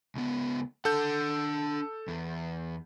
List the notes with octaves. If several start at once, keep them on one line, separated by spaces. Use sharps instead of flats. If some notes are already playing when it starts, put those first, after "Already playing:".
C#2 B3
D4 A4 F#5 G6
E2